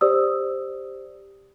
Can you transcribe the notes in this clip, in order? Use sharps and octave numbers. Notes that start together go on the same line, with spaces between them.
G4 C5 D5 D#6 E6